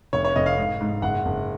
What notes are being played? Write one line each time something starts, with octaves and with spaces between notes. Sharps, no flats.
F1 C#5
C#5
F1 D#5
F5
G#2
G#2
F#1 F#5
F#1